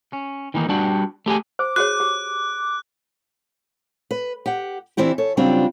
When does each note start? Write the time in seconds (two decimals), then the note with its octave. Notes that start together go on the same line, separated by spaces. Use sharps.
0.13 C#4
0.54 D#3 E3 A#3 D#4
0.69 G3 B3 D4 F#4 G4
1.26 A3 G4 G#4 G#5
1.59 C5 D6
1.76 F#4 G#4 C#5 F#6
2.00 G4
4.11 B4
4.46 G4 F#5
4.97 E3 C4 D4 E4 G4
5.18 A4 C#5
5.37 C#3 F#3 G3 C4 D4 F4